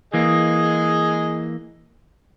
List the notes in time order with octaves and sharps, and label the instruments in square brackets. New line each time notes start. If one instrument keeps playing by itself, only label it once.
[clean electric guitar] E3 A#3 [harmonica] G#4 D#5